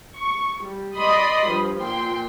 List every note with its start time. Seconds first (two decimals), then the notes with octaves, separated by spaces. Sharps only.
0.16 C#6
0.65 G3
0.97 D5 D#5 B5 C6 D#6
1.49 G2 F3
1.81 A#2 G5 C6